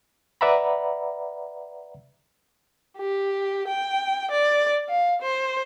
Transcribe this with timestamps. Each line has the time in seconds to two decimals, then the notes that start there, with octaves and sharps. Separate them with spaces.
0.41 B4 D5 E5 F#5 A#5 B5
2.98 G4
3.68 G5
4.31 D5
4.89 F5
5.22 C5